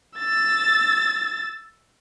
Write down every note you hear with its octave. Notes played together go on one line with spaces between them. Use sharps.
E6 A6